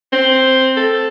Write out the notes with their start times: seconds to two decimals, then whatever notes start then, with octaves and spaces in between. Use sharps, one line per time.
0.13 C4
0.77 A4